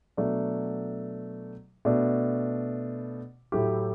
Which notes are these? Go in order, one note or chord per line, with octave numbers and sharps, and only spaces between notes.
B2 F#3 A3 D4
B2 A3 D4
A2 F#3 A3 E4 G4